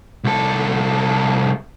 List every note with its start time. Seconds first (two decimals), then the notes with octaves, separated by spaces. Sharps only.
0.24 C2 A4